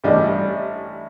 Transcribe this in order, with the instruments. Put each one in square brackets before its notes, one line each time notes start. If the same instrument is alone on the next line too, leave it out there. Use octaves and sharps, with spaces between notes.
[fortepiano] A1 G3 D4 D#5